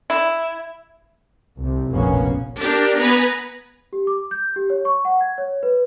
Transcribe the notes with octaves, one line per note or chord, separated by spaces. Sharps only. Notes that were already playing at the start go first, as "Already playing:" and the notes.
E4
C2 C3
F1 A#1 B2 A#3 B3 C#4
D4 G4 A#4
B3 B4 G#5 A#5
G4
D6
G6
G4
C#5
C#6
F#5
G#6
C#5
B4